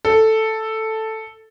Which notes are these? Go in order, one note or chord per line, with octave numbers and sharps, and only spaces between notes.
A4